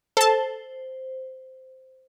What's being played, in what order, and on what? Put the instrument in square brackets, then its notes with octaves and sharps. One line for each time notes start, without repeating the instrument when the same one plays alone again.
[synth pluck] A4 A5 [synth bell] C5